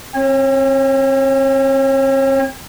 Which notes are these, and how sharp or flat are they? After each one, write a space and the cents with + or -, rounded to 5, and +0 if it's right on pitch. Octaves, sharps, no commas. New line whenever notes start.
C4 +30 C#5 -35